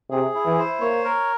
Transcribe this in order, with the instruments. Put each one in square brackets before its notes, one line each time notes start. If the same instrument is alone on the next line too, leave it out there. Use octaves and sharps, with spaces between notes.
[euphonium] C3 [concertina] G#4
[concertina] E4
[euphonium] E3
[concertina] C5
[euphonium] A#3 [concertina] C#5
[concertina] A#4